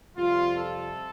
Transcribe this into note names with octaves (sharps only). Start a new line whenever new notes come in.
F2 C3 G3 F4
A4